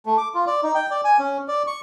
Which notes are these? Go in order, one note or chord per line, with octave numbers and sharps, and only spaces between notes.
A3
D6
F4
D5
D#4
G5
D5
G#5
C#4
D5
C#6